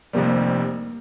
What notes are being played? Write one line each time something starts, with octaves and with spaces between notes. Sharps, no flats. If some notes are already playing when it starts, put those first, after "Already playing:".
F1 F2 C3 G3 A#3